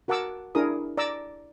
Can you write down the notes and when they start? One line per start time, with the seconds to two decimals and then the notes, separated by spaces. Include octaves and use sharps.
0.08 F#4 A#4 F#5 A5 D6 E6
0.55 D4 E4 G#4 A#4 D#6
0.97 D5 A#5 D6 E6